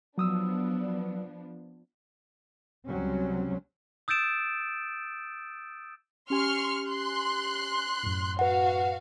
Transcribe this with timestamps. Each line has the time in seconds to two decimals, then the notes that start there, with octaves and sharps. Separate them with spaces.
0.18 F3 F#3 B3 D4 D#6 E6
2.87 C#2 C3 F#3 G3 C4 C#4
4.08 D#6 E6 G6 A6 D7 E7
6.30 C#4 G4 G#5 C6 C#6 F6
6.85 C6 F#6
8.03 F#2 A2
8.39 F#4 B4 F5 F#5